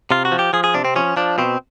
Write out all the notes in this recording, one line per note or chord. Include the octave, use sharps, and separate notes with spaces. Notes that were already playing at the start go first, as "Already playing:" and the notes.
C3 F4
F#4
F3
G4
F3 G#4
G#4
C3 D4
C4
F3 C#4
F3 D4
B2 C4